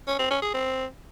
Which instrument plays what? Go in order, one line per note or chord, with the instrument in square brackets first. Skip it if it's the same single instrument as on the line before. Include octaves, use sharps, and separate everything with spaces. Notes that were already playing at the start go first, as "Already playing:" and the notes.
[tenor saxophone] C#4
C4
C#4
G#4
C4